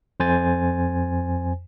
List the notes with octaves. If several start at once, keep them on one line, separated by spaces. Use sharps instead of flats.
F2 C5 G#5 A6